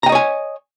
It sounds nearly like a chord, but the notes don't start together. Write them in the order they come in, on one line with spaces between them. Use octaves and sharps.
A#5 G5 D#5 C#5 G#5